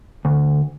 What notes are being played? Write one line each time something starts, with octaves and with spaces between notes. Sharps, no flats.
D2